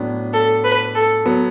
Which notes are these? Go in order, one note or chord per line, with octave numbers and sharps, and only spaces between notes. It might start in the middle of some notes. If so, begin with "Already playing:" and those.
Already playing: A2 F#3 B3 D4
A4
B4
A4
F#3 B3